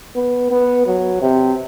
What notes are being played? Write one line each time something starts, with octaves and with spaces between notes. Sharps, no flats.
B3
B3
F#3
C3